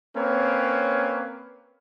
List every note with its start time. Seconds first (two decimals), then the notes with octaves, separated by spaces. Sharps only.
0.16 A#3 C4 C#4 B4 C#5